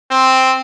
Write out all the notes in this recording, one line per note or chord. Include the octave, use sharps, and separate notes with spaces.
C4